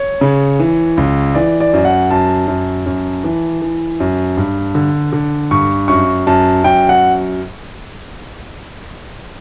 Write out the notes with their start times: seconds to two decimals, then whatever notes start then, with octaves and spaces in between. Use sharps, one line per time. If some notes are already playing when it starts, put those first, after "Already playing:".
Already playing: C#5
0.21 C#3
0.60 E3
0.97 C#2
1.34 E3 D5
1.60 D5
1.73 F#2
1.85 F#5
2.11 F#2 A5
2.48 F#2
2.86 F#2
3.24 E3
3.62 E3
4.00 F#2
4.37 G2
4.75 D3
5.13 D3
5.51 G2 C#6
5.88 F#2 C#6
6.27 F#2 A5
6.64 F#2 G5
6.89 F#5